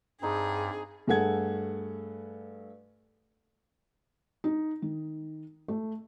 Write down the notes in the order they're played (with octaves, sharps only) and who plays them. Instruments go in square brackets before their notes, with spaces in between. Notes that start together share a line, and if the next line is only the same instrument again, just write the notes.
[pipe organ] G2 [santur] C4 D#4 F#5 [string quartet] G#4
[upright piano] G2 A3 G#4 A4 F#5 G#6
[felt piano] D#4
D#3
A3